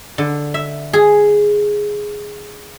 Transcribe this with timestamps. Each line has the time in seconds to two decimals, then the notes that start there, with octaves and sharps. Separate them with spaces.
0.18 D3
0.54 E5
0.93 G#4